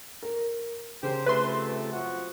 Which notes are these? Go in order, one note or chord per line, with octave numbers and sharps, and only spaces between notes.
A#4
C#3 G4 A#4 C5
C3 F3 A3 B4 C6
F#2 F3 F#4